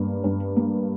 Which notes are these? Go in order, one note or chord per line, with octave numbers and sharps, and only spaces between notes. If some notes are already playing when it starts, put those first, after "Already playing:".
Already playing: G2 A#3
G2
A#3